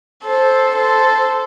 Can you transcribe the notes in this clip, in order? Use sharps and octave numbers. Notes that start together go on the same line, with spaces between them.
A4 C5
A4 C5